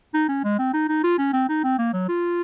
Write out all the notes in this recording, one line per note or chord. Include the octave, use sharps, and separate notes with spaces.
D#4
C#4
G#3
C4
D#4
D#4
F4
C#4
C4
D#4
C4
A#3
F#3
F4